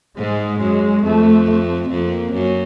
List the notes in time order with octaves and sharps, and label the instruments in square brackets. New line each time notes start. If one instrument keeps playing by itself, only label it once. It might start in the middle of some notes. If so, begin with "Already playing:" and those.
[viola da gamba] G#2 [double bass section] G#3
[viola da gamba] F#2
[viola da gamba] F2 [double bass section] A3
[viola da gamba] F2 [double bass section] A#3
[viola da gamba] F#2